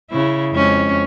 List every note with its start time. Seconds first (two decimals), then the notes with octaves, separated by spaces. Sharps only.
0.10 C#3 E4
0.52 F2 G#3 C#4